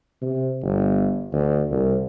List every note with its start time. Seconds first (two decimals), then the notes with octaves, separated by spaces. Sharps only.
0.22 C3
0.62 G1
1.33 D2
1.71 C2